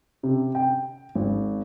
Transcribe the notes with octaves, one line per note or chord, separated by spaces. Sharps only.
C3
G5
G#1